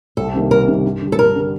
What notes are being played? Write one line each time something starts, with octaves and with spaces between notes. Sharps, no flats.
C2 A4
C3 D#3 G3 A#3
C2 A#4
C3 D#3 G3 A#3
G2
D3 G3
A4
G2 A#4
D3 G3